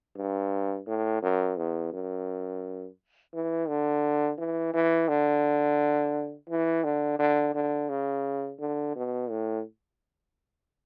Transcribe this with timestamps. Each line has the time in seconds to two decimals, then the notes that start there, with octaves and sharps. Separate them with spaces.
0.17 G2
0.87 A2
1.22 F#2
1.57 E2
1.93 F#2
3.34 E3
3.68 D3
4.38 E3
4.74 E3
5.09 D3
6.50 E3
6.84 D3
7.19 D3
7.55 D3
7.90 C#3
8.60 D3
8.96 B2
9.30 A2